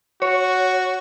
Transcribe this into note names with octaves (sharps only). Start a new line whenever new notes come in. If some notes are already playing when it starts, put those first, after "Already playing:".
F#4 C#5